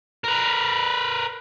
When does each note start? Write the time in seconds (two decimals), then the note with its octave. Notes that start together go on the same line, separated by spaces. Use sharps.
0.24 A#4 B4